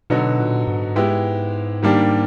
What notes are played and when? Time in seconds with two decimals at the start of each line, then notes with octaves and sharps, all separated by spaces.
0.10 B2 D3 F#3 B3 D#4 F#4
0.39 A#2
0.67 G#2
0.96 G#3 B3 E4 G4
1.83 D#3 G3 A#3 D4 G4